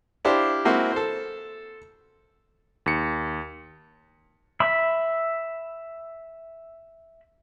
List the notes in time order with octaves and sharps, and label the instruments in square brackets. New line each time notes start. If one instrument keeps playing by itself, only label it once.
[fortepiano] D4 E4 G4 C5 F5
G#3 A#3 C4 E4 F#4
A4 C5
[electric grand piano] D#2 C#7
[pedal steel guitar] E5 B5